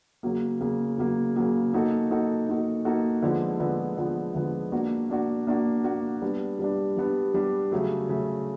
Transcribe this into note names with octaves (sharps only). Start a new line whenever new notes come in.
C#3 F#3 A#3
C#3 F#3 A#3
C#3 F#3 A#3
C#3 F#3 A#3
A#3 D#4 F#4 A4
A#3 D#4 F#4 A4
A#3 D#4 F#4 A4
A#3 D#4 F#4 A4
D3 F3 G#3 B3
D3 F3 G#3 B3
D3 F3 G#3 B3
D3 F3 G#3 B3
A#3 D4 F#4
A#3 D4 F#4
A#3 D4 F#4
A#3 D4 F#4
G3 B3 D4
G3 B3 D4
G3 B3 D4
G3 B3 D4
C#3 F#3 A3
C#3 F#3 A3